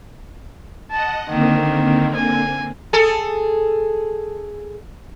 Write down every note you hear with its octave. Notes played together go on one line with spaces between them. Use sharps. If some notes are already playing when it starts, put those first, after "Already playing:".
D#5 F#5 A5
D3 D#3 A#3 C4
G#5
G#4 A4